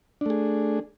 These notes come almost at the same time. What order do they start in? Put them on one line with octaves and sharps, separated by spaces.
D4 A3 G#4